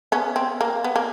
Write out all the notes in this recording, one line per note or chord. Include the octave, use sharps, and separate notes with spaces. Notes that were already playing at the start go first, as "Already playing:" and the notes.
B3 C#4
C4
A#3
B3
A#3